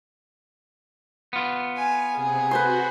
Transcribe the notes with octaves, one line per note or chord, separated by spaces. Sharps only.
B3 F4
F5 G#5
C3 G#4
F#4 B4 C5 C6